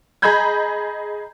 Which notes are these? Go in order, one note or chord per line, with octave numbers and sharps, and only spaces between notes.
G#4 D#5 A#5 B5 G6 G#6